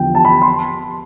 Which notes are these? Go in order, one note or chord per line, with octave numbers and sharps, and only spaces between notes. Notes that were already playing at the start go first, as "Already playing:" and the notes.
Already playing: E2 D3 F3 G5
A5
B5
C6